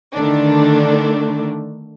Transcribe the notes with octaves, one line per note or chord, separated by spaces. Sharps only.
D3 D#3 A3 D4